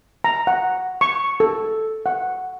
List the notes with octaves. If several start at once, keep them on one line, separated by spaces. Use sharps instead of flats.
A#5
F#5
C#6
A4
F#5